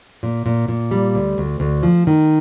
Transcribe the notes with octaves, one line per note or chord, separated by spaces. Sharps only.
A#2
A#2
A#2
G3
D2
D2
D2
F3
D#3